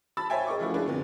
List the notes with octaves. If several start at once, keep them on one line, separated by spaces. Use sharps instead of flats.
A5 B5 E6 A6
C5 C#5 E5 G5 G#5
G#4 A#4 D#5 C#6 D6
C#3 F3 A3 E4 F#4
G#3 D4 E4 G#4 A#4 B4
F2 D3 B3